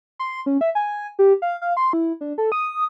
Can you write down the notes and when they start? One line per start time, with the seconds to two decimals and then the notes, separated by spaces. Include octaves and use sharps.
0.19 C6
0.46 C#4
0.61 E5
0.75 G#5
1.19 G4
1.42 F5
1.62 F5
1.77 C6
1.93 E4
2.21 D4
2.38 A4
2.52 D#6